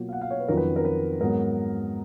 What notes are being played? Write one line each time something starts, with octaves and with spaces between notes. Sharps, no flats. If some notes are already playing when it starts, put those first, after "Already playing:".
Already playing: B2 F#3 A#3 F4
F5
F#5
F5
C#5
B4
F2 D#3 F#3 C#4 F4 A#4
B4
A#4
B4
G#2 F#3 B3 A#4